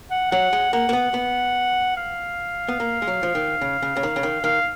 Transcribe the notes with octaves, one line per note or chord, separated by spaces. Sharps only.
F#5
F#3 F#5
G#3
A#3 F#5
A#3
B3
B3
F5
B3
A#3
G#3
F#3
F3
D#3
C#3
C#3
C#3
D#3
C#3
D#3
D#3 F5